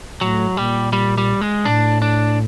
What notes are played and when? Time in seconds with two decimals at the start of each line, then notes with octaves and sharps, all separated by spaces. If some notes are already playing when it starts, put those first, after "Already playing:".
0.21 A2 F#3
0.57 A#2 G3
0.93 G3
1.18 G3
1.41 G#3
1.65 A2 D4
2.02 D4